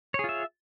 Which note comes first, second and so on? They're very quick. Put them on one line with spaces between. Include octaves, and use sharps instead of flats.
C#5 G#4 F4 E5